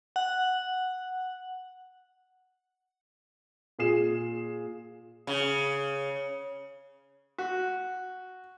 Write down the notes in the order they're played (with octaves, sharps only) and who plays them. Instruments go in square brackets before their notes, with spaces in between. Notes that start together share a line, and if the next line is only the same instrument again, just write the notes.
[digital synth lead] F#5
[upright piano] A#2 G#4 C7 E7
[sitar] C#3
[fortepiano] F#4